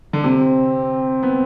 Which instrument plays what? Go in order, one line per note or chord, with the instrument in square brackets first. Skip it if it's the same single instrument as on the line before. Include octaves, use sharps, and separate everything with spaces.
[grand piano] D3
[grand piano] C3 [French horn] C4
[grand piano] B3